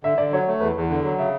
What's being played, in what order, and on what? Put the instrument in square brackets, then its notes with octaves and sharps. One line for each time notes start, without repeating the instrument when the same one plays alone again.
[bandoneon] D3 [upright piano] E5
[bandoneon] D3 [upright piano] D5
[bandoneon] F#3 [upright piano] C#5
[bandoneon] A3
[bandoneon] E2 [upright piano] B4
[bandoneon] E2
D3
F#3
[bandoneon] C#3 [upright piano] E5